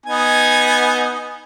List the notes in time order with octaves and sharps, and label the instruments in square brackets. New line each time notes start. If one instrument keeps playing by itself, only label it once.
[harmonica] B3 D#4 G#5